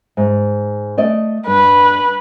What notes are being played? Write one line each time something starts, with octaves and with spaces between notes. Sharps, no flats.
G#2
A3 D5 D#5
G2 B4